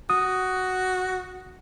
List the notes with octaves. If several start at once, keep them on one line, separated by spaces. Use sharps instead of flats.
F#4 D#6